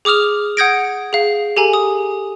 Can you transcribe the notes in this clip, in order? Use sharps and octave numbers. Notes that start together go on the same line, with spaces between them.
G#4 D6 D#6 F6 F7
F#5 D#6 G6 G#6 A#6 D7
G#4 F5
G4 A4 G#5 A#5
D#6